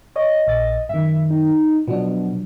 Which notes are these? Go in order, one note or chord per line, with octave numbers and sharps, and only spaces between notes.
C#5 D#5
A#1 A6
F#2 D#3 E5
D#4
B2 F3 F#3 D4